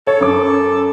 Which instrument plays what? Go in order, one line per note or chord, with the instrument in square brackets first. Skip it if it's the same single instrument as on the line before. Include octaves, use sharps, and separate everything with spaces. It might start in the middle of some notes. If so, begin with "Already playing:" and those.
[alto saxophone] A4 [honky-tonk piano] C#5
[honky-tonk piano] F#2 D6